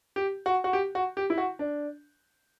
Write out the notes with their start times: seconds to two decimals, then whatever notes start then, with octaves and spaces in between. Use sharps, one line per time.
0.16 G4
0.46 F#4
0.64 F#4
0.73 G4
0.95 F#4
1.17 G4
1.30 E4
1.38 F#4
1.59 D4